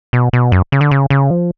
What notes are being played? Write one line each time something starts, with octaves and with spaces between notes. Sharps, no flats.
B2
B2
F#2
C#3
D3
C#3
C#3
F3